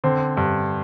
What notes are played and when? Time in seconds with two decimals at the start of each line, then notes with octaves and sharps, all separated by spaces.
0.04 D3 C4
0.37 G2